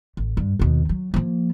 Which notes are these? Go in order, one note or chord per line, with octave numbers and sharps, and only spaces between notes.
A1
G2
D#2 B2
F#3
F3 A#3